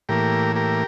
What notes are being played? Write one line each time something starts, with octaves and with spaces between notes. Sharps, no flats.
A2 E3 A#3 G4 A#4
G4 A#4